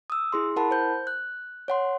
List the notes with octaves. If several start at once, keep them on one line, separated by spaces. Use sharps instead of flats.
D#6 E6
E4 G#4 C6
E4 A#4 F#5 A5 B5
C5 G6
F#6
C#5 F#5 C6